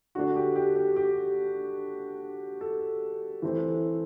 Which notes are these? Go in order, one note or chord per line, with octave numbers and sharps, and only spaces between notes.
D3 A3 D4 F#4
G4
G4
G4
G4
A4
E3 A3 C4